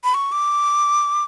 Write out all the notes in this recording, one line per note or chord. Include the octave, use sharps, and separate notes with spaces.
B5
C#6
D6